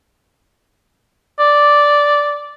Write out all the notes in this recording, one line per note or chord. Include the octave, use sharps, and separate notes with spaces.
D5